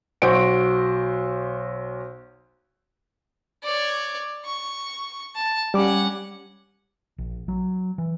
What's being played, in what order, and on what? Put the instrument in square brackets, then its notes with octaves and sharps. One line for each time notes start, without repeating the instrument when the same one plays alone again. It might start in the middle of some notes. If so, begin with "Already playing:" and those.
[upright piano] B1 F#4 C5 D7
[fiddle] C#5 D5
C#6
A5
[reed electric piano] G3 D6 [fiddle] C#4 F#5
[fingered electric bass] A#1
F#3
E3